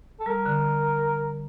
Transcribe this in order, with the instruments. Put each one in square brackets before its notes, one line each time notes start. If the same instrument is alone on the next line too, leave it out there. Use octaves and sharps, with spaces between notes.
[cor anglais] A4
[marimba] G3 [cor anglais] A#4
[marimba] D3